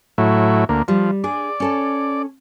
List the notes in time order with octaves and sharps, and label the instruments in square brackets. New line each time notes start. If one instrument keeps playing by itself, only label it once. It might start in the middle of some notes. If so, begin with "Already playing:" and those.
[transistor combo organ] A2 F#3 E4
D2 A#3
[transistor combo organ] F3 [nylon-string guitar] G3
[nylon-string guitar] D4 G#4 [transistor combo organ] D5
[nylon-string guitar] C#4 A4 A5